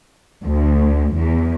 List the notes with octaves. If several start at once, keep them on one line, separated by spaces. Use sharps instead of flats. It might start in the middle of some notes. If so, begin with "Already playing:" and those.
D2
E2